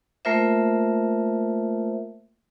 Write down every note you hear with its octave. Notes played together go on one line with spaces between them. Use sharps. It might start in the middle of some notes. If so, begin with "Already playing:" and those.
A3 A#3 F4 A#4 C5 E5